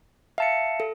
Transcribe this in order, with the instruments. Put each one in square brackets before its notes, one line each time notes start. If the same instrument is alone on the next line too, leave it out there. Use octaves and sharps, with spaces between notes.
[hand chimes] E5 [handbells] F5 A5 C#7
[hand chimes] A4